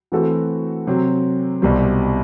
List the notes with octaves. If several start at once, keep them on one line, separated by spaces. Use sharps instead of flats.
E3 A3 C4 F#4 A4
C3 F#3 C4
C2 B2 G3 C4